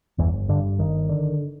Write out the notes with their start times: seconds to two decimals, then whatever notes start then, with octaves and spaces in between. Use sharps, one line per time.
0.18 G1 E2 E3
0.49 G2 D3
0.79 G1 D#3
1.09 D3